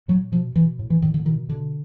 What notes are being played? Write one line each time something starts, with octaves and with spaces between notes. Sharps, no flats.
A#2 F#3
B2 F3
B2 E3
A2
E3
A2 D#3
D3
B2 D#3
B2 D3